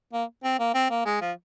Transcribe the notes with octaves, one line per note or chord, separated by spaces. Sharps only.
A#3
C4
A#3
C4
A#3
G#3
F3